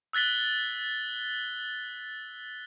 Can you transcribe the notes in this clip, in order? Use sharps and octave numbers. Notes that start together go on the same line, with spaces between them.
E6 F#6 A6 B6 G7